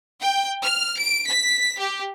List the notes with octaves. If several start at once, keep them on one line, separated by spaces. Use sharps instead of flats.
G5
F6
D7
B6
G4